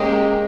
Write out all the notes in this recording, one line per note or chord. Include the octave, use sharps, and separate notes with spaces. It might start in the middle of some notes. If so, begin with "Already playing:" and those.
Already playing: G#3 A#3 C#4 G4